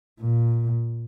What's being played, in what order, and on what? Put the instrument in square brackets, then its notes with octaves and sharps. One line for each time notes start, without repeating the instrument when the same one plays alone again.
[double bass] A#2